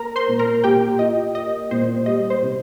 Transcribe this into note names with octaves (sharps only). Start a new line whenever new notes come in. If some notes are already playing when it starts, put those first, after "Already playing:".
Already playing: A#3 A#4 A#5
C5 C6
A#2
A#4 A#5
A#2 G4 G5
F4 D#5
A#3 D#5
A#2 C5
G3 D#5
C5
C3